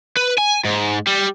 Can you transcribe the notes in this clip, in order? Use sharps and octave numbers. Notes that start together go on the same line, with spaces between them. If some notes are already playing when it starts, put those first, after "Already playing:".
B4
G#5
G#2
G3